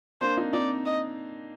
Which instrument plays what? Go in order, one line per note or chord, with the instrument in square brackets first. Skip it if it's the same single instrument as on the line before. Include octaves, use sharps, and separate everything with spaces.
[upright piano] A#3 D4 [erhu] C5
[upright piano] C4 D#4
[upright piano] C4 D#4 [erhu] D5
[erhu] D#5